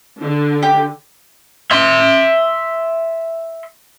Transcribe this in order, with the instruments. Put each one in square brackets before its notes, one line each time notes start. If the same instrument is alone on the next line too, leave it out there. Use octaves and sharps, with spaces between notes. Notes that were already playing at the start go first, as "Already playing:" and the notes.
[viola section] D3
[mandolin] G4
[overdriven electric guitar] E5 C6